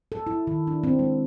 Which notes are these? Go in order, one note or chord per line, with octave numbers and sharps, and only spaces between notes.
A4
E4
D#3
D4
C4
G#3